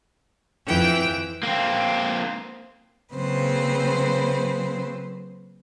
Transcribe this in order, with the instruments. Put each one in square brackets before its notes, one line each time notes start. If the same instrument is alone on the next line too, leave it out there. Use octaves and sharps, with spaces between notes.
[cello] F2 G5 [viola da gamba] E3
[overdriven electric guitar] A#3 C4
[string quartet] C#3 F#3 A#3 C4 B4 C5